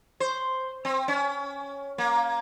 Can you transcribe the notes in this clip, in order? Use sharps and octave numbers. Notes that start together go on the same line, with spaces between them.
C5
C4
C#4
A#3